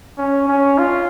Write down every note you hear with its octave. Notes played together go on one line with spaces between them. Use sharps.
C#4
C#4
F4